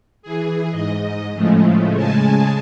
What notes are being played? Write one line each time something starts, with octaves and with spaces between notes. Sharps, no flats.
E3 G#4
G#2 D#5
A2 C#3 F3 G#3 A3
C#3 G#3 G#5 A5